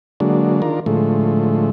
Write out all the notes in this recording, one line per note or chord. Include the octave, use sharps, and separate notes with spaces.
D3 F#3 G#3 A#3 D4
D#3 D4 F4 A#4
A2 D3 F3 G#3 A3